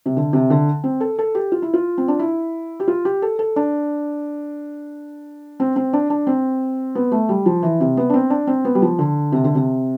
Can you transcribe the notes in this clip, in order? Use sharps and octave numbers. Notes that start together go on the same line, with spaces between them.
C3
D3
C3
D3
C4
A4
A4
G4
F4
E4
F4
C4
D4
E4
G4
F4
G4
A4
A4
D4
C4
C4
D4
D4
C4
B3
A3
G3
F3
E3
C3
B3
D4
C4
D4
C4
B3
G3
F3
D3
C3
D3
C3